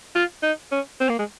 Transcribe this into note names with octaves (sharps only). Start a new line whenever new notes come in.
F4
D#4
C#4
C4
A#3
G#3